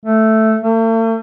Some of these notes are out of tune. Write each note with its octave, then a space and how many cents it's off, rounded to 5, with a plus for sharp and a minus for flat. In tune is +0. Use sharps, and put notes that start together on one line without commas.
A3 +0
A3 +45